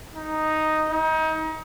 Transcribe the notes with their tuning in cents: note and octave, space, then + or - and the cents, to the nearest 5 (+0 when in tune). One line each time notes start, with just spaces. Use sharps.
D#4 +0
D#4 +30